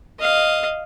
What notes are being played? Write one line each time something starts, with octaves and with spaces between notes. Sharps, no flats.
D#5 F5